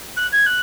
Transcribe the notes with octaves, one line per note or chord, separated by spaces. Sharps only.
F#6
G#6
F#6